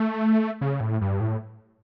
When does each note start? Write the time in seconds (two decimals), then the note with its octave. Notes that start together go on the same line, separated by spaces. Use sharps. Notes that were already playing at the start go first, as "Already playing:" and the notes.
Already playing: A3
0.61 C#3
0.80 A2
1.01 G2
1.20 A2